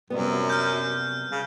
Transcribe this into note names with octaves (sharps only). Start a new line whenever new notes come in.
F#2 C3 G3 B3
F6 G6
C#3